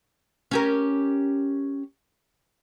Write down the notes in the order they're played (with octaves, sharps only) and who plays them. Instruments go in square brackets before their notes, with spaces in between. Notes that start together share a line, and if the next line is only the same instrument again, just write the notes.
[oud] C#4 G4 A#4